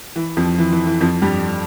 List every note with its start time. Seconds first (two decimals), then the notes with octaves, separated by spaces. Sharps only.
0.16 E3
0.37 F2 F3
0.58 E3
0.72 E3
0.86 E3
1.01 F2 F3
1.22 G2 G3